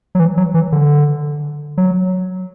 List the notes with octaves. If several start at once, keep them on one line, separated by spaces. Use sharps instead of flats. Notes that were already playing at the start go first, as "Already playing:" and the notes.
F#3
E3
F#3
E3
D3
F#3